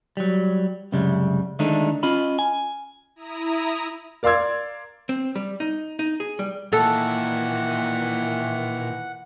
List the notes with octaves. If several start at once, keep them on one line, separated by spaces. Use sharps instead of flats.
F#3 G3
C2 F#2 C#3 G3 G#3
D3 D#3 G#3 A3 D4 D#4
C#4 F4 D#5 B5
G#5
E4 A#5 D#6
A#4 D5 F5 C6 E6 G#6
C4
G3
D#4
D#4
G#4
G3
A#2 D#3 E3 A4 F#5